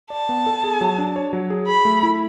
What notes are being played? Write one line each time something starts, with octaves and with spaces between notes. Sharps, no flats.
D5 A5
B3
A4
G#4
F#3
D4
C#5
F#3
G#4
G#4 B5
A3
E4